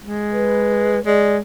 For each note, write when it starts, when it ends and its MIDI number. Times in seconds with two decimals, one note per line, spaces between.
0.04 0.98 56
0.32 1.04 71
1.06 1.38 56
1.06 1.36 74